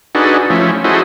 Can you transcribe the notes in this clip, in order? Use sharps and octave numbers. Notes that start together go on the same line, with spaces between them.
D4 D#4 F#4 G#4 A4 B4
F3 A3 C#4 E4
E4 F#4 G#4 A4 C5 D#5